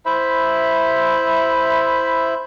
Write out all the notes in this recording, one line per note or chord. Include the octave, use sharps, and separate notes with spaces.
E4 C5 E5 B5